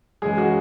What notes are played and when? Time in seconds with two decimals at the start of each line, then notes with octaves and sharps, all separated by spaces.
0.22 F#2 C#3 E3 G#3 G#4
0.38 F#3 F#4